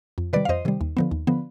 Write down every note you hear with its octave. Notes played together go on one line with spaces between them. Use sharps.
F2
C3 D#3 G3 B4 D5
F5
F2 C5 D#5
C3 D#3 G3
D#2
D3 F3 B3
D#2
D3 F3 B3